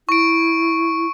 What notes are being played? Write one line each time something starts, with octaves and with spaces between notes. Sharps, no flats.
E4 C#6 D7